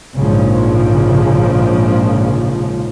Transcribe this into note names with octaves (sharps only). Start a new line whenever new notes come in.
A#1 G#2 C#3 F3